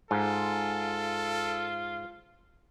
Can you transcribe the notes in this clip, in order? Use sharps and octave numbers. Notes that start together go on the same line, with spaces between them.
G#2 F4 A4